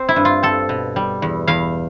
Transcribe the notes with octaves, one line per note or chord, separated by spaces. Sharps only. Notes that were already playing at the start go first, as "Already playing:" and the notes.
Already playing: C4
E4
G2
F4
C4 A4
B2
G3
E2
E2 F5